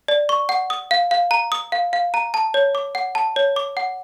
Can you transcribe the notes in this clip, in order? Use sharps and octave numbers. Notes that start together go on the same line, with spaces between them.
D5
C#6
F#5
D#6
F5
F5
A#5
D#6
F5
F5
A#5
A5
C#5
D6
F#5
A5
C#5
D6
F#5